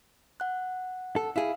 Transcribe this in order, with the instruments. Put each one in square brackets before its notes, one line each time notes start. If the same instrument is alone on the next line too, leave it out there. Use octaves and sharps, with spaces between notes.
[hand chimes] F#5 F#6
[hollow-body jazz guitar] A4
[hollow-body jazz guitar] E4 G#4 [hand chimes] F5